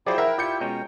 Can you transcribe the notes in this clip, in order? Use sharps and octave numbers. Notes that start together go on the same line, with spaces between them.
F3 F#3 E4 G4 G#4 C5 D5 G5
A#4 E5 F#5 A#5
F4 G4 D5 G6 C#7
B2 G#3 C#4 G5 A#5